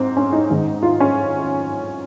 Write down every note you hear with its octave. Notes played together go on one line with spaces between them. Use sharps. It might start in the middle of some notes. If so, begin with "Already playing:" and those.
Already playing: G#2 C4
C#4
D#4
G#2 D#3 G#3
F4
C#4